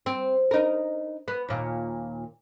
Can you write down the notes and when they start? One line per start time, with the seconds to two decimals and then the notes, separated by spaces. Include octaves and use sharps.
0.06 C4
0.51 D#4 A#4
1.28 B3
1.49 D#2 A#2